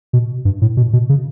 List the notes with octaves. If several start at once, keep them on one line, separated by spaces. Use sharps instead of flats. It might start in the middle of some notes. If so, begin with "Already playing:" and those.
B2
G2
A2
B2
B2
C#3